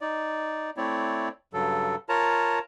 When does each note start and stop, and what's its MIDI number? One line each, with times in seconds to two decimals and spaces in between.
0.01 0.70 63
0.01 0.70 74
0.77 1.29 57
0.77 1.29 60
0.77 1.29 64
0.77 1.29 73
0.77 1.29 74
1.53 1.96 43
1.53 1.96 49
1.53 1.96 54
1.53 1.96 69
2.09 2.59 65
2.09 2.59 70
2.09 2.59 73
2.09 2.59 81
2.09 2.59 82